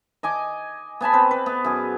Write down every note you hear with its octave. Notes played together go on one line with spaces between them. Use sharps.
D#5 G#5 D6
B3 G#5 A5 B5
C4 B4
B4
B3
F#2 G#4